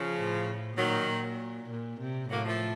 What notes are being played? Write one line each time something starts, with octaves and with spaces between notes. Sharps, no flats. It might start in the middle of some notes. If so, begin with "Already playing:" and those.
Already playing: C#3 F3
A2
A#2 D#3 F#3
A#2
A#2
C3
A2 F#3 A#3
F3 A3